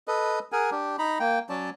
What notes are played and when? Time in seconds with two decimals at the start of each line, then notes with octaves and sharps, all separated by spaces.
0.08 A4 B4 D#5
0.52 G#4 A#4 F#5 G#5
0.71 D4 G4
0.98 D#4 A#5 B5
1.20 A#3 G5
1.50 F#3 C#4 D5 A5